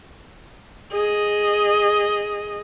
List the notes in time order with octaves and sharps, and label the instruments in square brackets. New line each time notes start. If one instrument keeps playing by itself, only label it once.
[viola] G#4 D#5